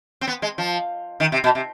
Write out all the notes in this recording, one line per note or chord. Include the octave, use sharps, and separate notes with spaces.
C4
B3
G#3
F3
D#3
C3
B2
C3